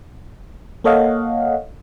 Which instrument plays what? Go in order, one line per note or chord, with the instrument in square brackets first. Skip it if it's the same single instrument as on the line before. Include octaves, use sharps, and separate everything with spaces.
[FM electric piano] A#3 A4 C#5 D#5 F5 F#5